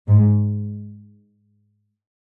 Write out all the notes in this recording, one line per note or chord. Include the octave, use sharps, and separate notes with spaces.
G#2